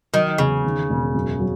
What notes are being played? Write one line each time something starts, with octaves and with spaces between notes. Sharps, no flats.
D#3 F#3
E2 C#3
D#3
E1
F#2
F#3